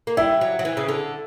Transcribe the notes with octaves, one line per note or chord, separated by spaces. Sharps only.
A#3
G3 E4
F#3
F#3
E3
C#3
D3